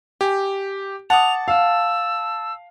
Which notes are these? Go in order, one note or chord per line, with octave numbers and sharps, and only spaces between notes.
G4 G#5
F#5 A5 D6 D#6 F7
F5 E6